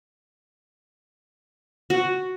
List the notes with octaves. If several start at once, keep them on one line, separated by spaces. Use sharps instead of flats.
F#4